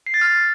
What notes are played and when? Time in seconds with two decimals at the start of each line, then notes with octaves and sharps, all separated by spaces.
0.07 C7
0.14 A6
0.21 F6